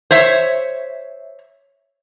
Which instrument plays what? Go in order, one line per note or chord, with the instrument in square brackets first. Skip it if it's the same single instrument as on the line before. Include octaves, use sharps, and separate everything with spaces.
[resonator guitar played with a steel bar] C5 C#5 E5